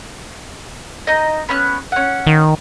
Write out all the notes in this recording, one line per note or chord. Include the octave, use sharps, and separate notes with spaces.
D#4 D#5
B3 C#4 F#6
C#4 F#5
D#3